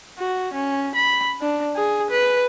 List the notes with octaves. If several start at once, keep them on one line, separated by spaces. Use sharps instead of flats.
F#4
C#4
B5
D4
G#4
B4